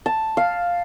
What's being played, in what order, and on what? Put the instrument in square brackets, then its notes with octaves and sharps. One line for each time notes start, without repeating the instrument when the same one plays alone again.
[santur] A5
F5